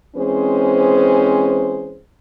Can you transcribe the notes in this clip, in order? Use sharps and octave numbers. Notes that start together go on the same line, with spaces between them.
E3 G#3 C4 C#4 G#4 C5